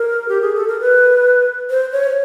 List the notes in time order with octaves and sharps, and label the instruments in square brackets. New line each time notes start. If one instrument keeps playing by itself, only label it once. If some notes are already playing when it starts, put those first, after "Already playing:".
Already playing: [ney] A#4
G4
G#4
A4
A#4
B4
C5
C#5